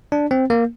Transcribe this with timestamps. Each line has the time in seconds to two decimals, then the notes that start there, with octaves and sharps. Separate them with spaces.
0.12 D4
0.31 C4
0.50 A#3